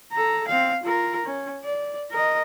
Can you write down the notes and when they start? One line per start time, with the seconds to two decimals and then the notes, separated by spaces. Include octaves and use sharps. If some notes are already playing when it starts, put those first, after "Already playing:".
0.12 A4 A#5
0.48 C4 F5
0.83 F4 A#4
1.25 C#4
1.64 D5
2.11 A#4 D#5